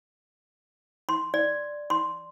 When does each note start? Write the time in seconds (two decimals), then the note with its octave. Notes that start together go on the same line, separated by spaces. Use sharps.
1.09 C6
1.34 D5
1.90 C6